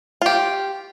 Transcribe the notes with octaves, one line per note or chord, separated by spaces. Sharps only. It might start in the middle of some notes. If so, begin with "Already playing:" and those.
F4 G4